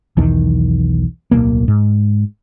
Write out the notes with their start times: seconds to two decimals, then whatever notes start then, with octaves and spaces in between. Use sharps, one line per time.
0.17 B1 E2 D#3
1.31 D1 B1 A#3
1.68 G#2